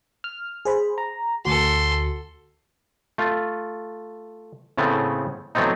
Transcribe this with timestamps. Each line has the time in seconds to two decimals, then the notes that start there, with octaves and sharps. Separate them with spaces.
0.24 F6
0.65 G#4 C5 B5
0.98 A#5
1.45 D2 F#4 A4 C6
3.18 A3 F4
4.78 A2 C#3 A3 B3 C4
5.55 E3 F#3 A3 B3 C4 D#4